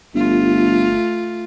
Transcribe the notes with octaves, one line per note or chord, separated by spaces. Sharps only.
G1 A3 F4